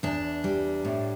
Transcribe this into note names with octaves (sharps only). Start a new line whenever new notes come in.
E2 D4
G3
A2